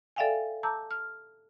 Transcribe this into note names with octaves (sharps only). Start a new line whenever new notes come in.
A4 D5 E5 F5 G5 G#5
A5 A#5 D6 E6 G6
F6